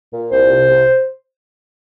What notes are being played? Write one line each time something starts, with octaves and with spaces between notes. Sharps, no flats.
A#2
C2 C5
C3
C2